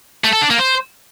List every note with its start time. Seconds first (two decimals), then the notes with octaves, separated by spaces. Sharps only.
0.24 A3
0.33 A4
0.42 D4
0.50 A#3
0.59 C5